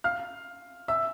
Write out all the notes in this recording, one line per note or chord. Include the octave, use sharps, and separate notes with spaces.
F5 F6
E5 E6